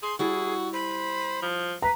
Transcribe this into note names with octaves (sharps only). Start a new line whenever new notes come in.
G#4 C6
G3 E4 F#4 G#4
C5 B5
F3
B4 A#5